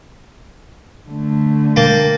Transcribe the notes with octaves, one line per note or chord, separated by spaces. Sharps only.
D3 A3
A#3 G5 A5